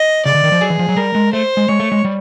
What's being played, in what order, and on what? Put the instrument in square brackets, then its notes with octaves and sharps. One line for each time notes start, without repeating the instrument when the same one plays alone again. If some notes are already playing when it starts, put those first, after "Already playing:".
Already playing: [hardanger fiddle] D#5
[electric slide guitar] C#3 [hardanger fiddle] D5
[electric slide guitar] D3
D#3
F3
[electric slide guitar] F#3 [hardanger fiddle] G#4
[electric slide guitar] E3
F3
F#3
[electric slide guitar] G3 [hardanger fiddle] A#4
[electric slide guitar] G#3
[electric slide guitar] A3 [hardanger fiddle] C5
[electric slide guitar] G#3
[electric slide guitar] G#3 [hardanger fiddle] C#5
[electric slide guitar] A3
G#3
G3